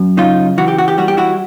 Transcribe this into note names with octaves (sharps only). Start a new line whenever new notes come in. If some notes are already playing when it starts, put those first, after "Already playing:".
Already playing: F#2
C#3 D#4 F4
E3 F#4
G4
F#4
G4
G3 F#4
G4
E4 F#4